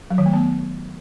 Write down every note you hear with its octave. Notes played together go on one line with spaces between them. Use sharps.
F#3
D#3
A3
B3